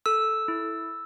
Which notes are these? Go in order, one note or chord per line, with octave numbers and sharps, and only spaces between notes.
A4 E6
E4